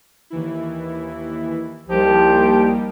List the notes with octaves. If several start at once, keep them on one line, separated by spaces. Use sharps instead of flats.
D#2 E3 E4
C2 F3 G3 A#3 D#4 G4